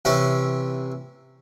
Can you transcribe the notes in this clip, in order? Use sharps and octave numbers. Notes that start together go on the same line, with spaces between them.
C3 E3 C#4